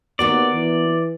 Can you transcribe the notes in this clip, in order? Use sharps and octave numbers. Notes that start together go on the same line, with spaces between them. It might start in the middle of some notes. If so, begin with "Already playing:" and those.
D#2 B3 F#4 A#4 D5
E3